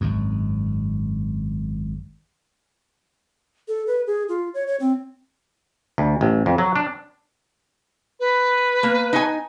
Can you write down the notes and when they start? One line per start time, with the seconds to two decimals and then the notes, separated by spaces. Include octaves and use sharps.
0.01 G#1 F#2
3.68 A4
3.87 B4
4.07 G#4
4.29 F4
4.54 C#5
4.67 C#5
4.80 C4
5.98 D2
6.21 A1
6.46 F2
6.58 F#3
6.76 D4
8.20 B4
8.83 A#3
9.13 D#4 G#5